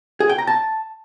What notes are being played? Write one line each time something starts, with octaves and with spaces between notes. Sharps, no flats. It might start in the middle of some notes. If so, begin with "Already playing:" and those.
G#4
G5
A#5
A5